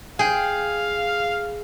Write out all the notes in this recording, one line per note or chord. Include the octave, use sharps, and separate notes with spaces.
G#4 F5 G5